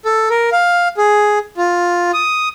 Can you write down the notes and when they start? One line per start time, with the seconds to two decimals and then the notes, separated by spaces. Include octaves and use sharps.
0.05 A4
0.30 A#4
0.52 F5
0.97 G#4
1.57 F4
2.14 D#6